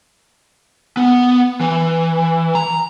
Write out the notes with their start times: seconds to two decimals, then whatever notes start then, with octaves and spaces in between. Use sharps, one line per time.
0.97 B3
1.61 E3
2.55 A#5